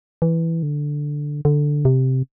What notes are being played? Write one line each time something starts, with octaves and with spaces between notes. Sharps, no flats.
E3
D3
D3
C3